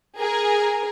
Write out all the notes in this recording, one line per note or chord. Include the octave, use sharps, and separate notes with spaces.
G#4 A#4